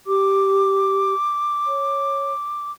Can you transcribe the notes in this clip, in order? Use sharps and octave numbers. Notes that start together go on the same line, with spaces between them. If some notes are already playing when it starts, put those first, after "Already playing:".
G4 D6
C#5